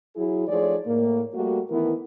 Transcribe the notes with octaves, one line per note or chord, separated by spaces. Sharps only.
F#3 E4 G#4
F3 A3 D#4 G#4 C#5 D5
A2 A#3
G3 A3 A#3 F#4
D#3 E3 A3 B3 E4 A#4